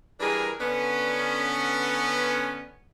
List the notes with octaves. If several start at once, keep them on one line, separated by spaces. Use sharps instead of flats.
E3 G3 D4 G#4 A#4
D3 B3 C#4